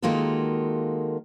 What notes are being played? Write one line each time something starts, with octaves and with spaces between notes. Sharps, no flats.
D#3 G#3 A#3 F4 F#4 A4